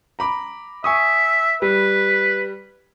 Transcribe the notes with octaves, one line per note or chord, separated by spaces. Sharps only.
A#5 B5 D6
E5 G#5 C#6 D#6
G3 B4